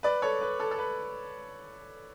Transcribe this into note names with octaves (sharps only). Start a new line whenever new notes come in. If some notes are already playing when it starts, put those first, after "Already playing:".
B4 D5
A4 C#5
B4
A4
A4
B4